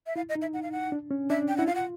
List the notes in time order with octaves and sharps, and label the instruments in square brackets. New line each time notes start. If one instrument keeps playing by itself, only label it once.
[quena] E5
[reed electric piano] E4 [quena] F5
[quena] D#5
[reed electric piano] D#4
[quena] E5
F#5
F5
F#5
[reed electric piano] D4
C#4
[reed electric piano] D4 [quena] E5
[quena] G5
[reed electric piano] E4 [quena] F#5
[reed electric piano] F4 [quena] F5
[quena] F#5